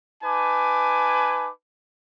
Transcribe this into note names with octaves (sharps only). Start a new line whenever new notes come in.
D#4 B4 G#5 A5 D6